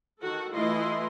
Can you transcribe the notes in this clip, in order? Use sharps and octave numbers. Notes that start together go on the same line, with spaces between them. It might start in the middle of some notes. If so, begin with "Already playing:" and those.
D#3 F#4 A4
E3 A3 E4 F4 D#5 C6